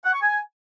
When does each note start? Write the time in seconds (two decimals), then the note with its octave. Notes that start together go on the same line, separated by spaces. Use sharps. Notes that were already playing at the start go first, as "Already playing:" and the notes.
0.05 F#5
0.13 C#6
0.21 G#5